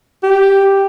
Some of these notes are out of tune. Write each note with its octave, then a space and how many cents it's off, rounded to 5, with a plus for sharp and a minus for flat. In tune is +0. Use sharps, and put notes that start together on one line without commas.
G4 +0